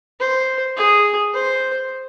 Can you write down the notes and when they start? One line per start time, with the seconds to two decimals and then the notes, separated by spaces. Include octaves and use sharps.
0.20 C5
0.76 G#4
1.33 C5